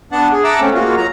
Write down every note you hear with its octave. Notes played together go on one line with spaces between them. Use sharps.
B3 D4 F#5 A5
G#4
E5 F#5 A5 A#5 D6 E6
A3 C4 C#4
G#3 A#3 F4 F#4
F#3 A#5